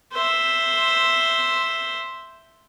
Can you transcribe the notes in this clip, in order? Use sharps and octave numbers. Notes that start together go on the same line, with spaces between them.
C5 E5